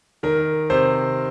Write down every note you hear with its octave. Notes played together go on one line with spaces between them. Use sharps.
D#3 A#4
C3 C5